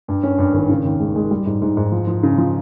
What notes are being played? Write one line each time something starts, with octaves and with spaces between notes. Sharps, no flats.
G2
C#4
G2
G#1
C#3
D#2
G#3
G#3
G3
G#2
G#2
G#2
F3
F3
C#3
F3